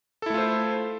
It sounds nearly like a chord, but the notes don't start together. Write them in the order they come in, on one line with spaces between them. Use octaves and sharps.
A4 E4 A3 F4 C5